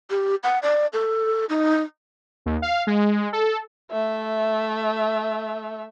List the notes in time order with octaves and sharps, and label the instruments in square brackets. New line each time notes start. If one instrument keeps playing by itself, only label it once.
[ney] G4
F#5
D5
A4
D#4
[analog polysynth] D#2
F5
G#3
A4
[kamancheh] A3 E5